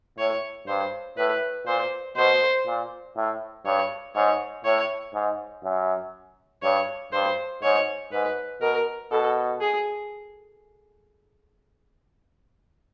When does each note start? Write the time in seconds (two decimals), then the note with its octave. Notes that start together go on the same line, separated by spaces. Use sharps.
0.18 A2 C#5
0.68 G2 C5
1.18 A2 B4
1.67 A#2 C5
2.17 B2 C5
2.67 A#2
3.16 A2
3.65 G2 C#5
4.15 G#2 C#5
4.65 A2 C#5
5.14 G#2
5.64 F#2
6.63 G2 C#5
7.13 G2 C5
7.63 G#2 C#5
8.12 G#2 B4
8.62 B2 A#4
9.12 B2 A4
9.61 G#4